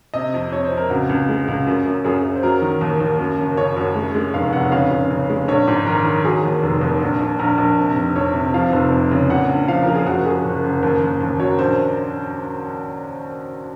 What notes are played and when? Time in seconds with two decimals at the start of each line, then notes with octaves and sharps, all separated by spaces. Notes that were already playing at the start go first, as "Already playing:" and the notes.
0.14 C3 D#5
0.34 F2
0.52 F2 C#5
0.64 C5
0.72 F2
0.77 A#4
0.90 C#2 F#4
1.09 C#2
1.29 G#3
1.48 C#2
1.67 F#2
1.86 F#2
2.04 F#2 G#4
2.24 F#2
2.36 C5
2.43 F#3 A#4
2.62 D#3
2.81 D#2
3.00 D#2
3.19 F#2
3.39 F#1
3.57 C#3 C#5
3.76 F#2
3.95 G#3
4.15 G#3
4.34 F1 F5
4.53 F1 F#5
4.72 C#3 F5
4.91 C#3
5.11 C#3
5.30 G#3
5.48 A#1 C#5
5.68 G#2
5.86 D#3 A#4
6.05 D#3
6.25 F#3 G#4
6.44 D#2
6.63 F1
6.81 D#2
7.01 A#1
7.20 A#1
7.39 A#1 A#4
7.58 A#1
7.78 C3
7.96 F1
8.16 F2 C#5
8.35 C3
8.54 F3 F5
8.73 F1
8.92 F2
9.11 C#3
9.30 A#2 F#5
9.49 A#1
9.68 F3 F5
9.83 F3 A#4
9.95 G#4
10.07 F#1 F#4
10.25 F#2 G#4
10.44 F#1
10.64 F#1
10.83 D#2
11.02 D#2
11.21 D#2
11.39 F#3 C#5
11.59 A#1 C5